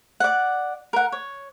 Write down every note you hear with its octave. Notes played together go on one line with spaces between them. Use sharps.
D5 F#5
A#4 F#5
C#5